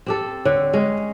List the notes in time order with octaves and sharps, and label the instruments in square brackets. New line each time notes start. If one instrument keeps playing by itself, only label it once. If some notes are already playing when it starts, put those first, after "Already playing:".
[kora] C4 G4 A4
[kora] D3 [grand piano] C#5
[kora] G#3 C#4